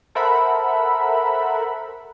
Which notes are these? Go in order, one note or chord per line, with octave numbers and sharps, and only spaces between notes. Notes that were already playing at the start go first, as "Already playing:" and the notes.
A4 A#4 C5 E5 F#5 B5